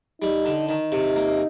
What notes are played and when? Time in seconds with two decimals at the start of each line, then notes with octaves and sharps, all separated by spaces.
0.22 G3 D#4
0.45 D3
0.69 D#3 D#4
0.92 C3
1.16 A#3